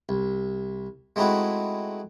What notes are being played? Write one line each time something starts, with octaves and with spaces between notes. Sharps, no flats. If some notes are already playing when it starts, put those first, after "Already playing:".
C2
G#3 A3 C4 D#4 E4 F#4